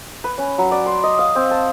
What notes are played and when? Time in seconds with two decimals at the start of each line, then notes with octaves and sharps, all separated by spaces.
0.24 B4
0.38 C#4
0.58 F#3
0.71 D5
0.86 C6
1.03 D#5
1.19 F5
1.35 C4
1.51 A5